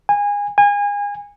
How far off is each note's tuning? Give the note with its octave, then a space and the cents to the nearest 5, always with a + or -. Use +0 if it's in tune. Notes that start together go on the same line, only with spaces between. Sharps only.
G#5 -25
G#5 -30